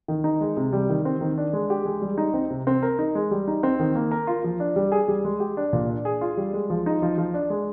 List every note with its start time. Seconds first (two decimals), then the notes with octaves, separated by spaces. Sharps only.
0.08 D#3
0.24 D#4
0.41 G#3
0.57 C3
0.73 G3
0.89 D#3
1.05 C4
1.21 D#3
1.38 D4
1.53 G#3
1.70 G4
1.85 G#3
2.02 G3
2.18 D#4
2.34 C4
2.50 C3
2.67 C4
2.83 A#4
2.99 D#4
3.15 G#3
3.31 G3
3.48 D#4
3.63 C4
3.79 D#3
3.95 A#3
4.11 A#4
4.27 F4
4.44 F3
4.60 D4
4.76 G3
4.92 G#4
5.08 G3
5.25 G#3
5.40 G4
5.57 D4
5.73 A#2
5.89 D4
6.05 G#4
6.21 F4
6.37 G3
6.53 G#3
6.70 F3
6.86 D#4
7.02 F3
7.18 F3
7.34 D4
7.50 G#3